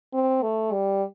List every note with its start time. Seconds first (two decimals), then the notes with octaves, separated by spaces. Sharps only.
0.13 C4
0.43 A3
0.72 G3